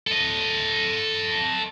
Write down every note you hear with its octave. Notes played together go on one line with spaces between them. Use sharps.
A4 D#5